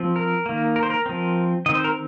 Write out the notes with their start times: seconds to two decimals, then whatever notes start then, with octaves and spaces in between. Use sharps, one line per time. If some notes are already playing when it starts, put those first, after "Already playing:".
Already playing: F3 C4
0.16 A#4
0.46 D#3 A#3
0.76 A#4
0.83 C5
0.90 A#4
1.06 F3 C4
1.66 D#3 C4 D#5
1.75 C5
1.84 A#4